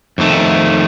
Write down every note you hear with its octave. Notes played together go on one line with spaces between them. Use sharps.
F2 D#3 A3